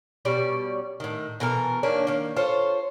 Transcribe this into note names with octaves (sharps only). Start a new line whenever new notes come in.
B2 G3 C#4 D5
A2 D#3
B2 E3 A4 A#4
D#3 A#3 C#4 D4
D#3 A#3
F4 A4 C5 C#5